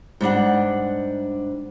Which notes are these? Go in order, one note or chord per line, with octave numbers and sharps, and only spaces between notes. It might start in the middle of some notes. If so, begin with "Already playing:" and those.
G#2 G3 D4 F#5